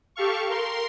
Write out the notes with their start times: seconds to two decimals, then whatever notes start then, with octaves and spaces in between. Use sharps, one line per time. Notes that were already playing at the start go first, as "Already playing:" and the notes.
0.16 G4 A4 F5 C#6
0.49 A#4 C6